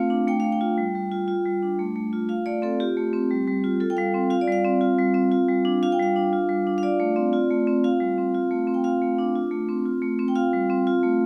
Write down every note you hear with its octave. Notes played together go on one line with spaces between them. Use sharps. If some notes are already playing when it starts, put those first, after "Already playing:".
Already playing: A3 C4 F4 F5
D4
A3 G5
A3 F5
G5
F4
G3
G3
F4
F4
G3
D4
A3
A3
F4
F4 F5
A3 D5
C4 A4
F4 G4
A3
C4
G3
G3
F4
F4 A4
G5
G3 F5
C4
F4 F5
D5
G3 F5
C4
F4
G3
C4
F4
G3
D4
F4 F5
G5
G3 F5
D4
F4
G3
D4
F5
F4 D5
A3
C4
F4
A3
C4
F4 F5
G3
C4
F4
A3
C4
G5
F4 F5
A3
D4
F4
A3
C4
F4
A3
C4
G5
F4 F5
G3
C4
F4
A3